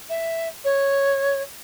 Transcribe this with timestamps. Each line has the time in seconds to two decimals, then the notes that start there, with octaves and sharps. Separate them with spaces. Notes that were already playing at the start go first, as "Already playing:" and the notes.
0.09 E5
0.64 C#5